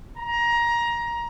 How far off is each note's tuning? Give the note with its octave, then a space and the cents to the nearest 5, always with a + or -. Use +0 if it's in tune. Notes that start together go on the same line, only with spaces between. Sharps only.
A#5 +20